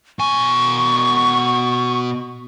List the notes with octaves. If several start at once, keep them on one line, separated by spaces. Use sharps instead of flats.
B2 G#5 C#6